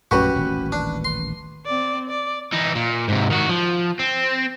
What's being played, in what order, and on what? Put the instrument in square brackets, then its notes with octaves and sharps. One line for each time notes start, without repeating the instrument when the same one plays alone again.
[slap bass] A#1 F#2 A3 [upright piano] C#4 B4 C#6 [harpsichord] F#4 G4
[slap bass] D#1 A1 D#3
[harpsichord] D4
C6
[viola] C4 D5
D5
[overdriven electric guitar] E3 D#4
A#2
G#2 C3
D#3 F#4
F3
C4